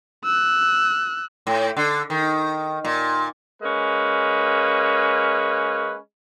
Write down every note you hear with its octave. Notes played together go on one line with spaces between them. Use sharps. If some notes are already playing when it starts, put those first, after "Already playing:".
E6 F#6
A2
D3
D#3
A#2
G#3 A#3 C#4 B4